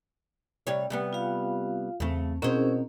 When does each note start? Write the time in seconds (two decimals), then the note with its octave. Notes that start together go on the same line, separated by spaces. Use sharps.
0.67 C3 G3 C#5
0.90 C3 G3 B3
1.13 F4 F5
2.00 E2 C#3 A3 C4
2.42 B2 C4 C#4 E4 G#4 A#4 C5